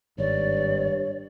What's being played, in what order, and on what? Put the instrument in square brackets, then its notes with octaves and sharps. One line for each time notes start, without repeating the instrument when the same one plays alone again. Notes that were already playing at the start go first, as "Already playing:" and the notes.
[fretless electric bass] G#1 [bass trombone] G2 [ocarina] C#5 [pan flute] D5